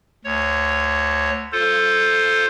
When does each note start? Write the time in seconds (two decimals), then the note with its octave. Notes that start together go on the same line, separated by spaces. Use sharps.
0.25 D2 C#5
1.52 F4 A4 C5